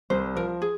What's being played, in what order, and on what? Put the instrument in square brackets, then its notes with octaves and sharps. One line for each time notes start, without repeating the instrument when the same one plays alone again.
[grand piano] C2 [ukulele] C5
[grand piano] F3 [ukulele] A#4
[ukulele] G#4